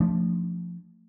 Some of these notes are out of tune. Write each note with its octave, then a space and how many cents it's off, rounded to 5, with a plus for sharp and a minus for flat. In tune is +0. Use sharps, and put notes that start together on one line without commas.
F3 +0 A3 +25 D4 -20